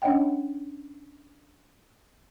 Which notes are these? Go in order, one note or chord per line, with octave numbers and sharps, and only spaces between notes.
C#4 D4 C#5 D#5 F#5 G5